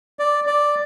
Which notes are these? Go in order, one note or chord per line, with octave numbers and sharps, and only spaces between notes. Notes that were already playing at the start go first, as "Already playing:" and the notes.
D5
D5